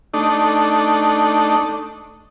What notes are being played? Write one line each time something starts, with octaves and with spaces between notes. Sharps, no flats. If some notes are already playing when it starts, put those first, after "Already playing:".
A3 D4 D#4